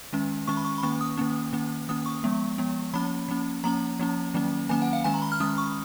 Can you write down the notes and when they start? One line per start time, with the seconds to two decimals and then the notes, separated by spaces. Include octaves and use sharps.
0.13 D#3 G#3 C#4
0.47 D#3 G#3 C#4 C#6
0.57 B5
0.65 C#6
0.78 B5
0.83 D#3 A#3 C#4 C#6
1.01 D#6
1.17 D#3 A#3 C#4
1.53 D#3 A#3 C#4
1.89 D#3 A#3 C#4 D#6
2.06 C#6
2.24 F3 G#3 B3
2.58 F3 G#3 B3
2.94 F3 A#3 C#4 B5
3.28 F3 A#3 C#4
3.64 F3 A#3 C#4 A#5
4.00 F3 A#3 C#4
4.34 D#3 F#3 A#3 C#4
4.69 D#3 F#3 A#3 C#4 G#5
4.82 F#5
4.93 F5
5.04 D#3 G#3 C#4 G#5
5.14 A#5
5.22 B5
5.32 F6
5.40 D#3 G#3 C#4 D#6
5.58 C#6